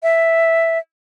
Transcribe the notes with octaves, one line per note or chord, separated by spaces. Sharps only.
E5